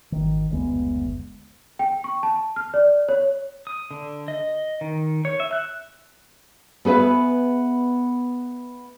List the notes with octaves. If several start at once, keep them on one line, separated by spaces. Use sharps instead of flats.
G#1 D#3
F#1 D2 G#3 B3
G5
C#6
A5
F6
D5
C#5
D#6
D3
D#5
D#3
C#5
E5
F#6
B3 G#4 B4 E5